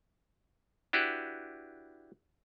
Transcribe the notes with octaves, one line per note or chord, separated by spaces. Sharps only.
D4 E4 F#4 G4 B4